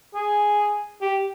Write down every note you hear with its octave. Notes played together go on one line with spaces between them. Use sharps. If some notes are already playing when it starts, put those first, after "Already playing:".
G#4
G4